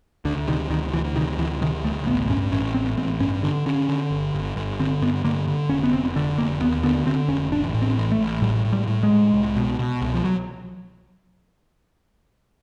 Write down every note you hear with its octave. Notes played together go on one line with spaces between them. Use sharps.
D2 D3
C3 D#3
D2 D#3
D2 E3
C3 D#3
D2 E3
C3 D#3
D2 A3
A1 B3
G2 C#4
A1 C#4
A1 C4
A1 C4
G2 C#4
D3 D4
D3 C#4
D3
G1
G1
G1
D3 C4
G2 B3
D3 A#3
D3
F1 C#4
B3
F1 C4
D3
F1 A#3
D#2 B3
D3 B3
D3 C4
F1 C#4
A1 D4
A2
C4
A1
A3
A1
A2 G3
A2
G3
A2
G#3
A2
C2
B2
B2
C2
F3
F#3